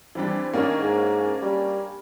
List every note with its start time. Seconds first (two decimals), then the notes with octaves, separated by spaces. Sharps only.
0.15 E3 G3 C4 D4
0.53 D#3 A#3 C#4 D4
0.78 G#2
1.42 G3